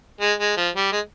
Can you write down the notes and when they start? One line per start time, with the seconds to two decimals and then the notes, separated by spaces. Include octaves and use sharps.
0.21 G#3
0.40 G#3
0.57 F3
0.75 G3
0.92 G#3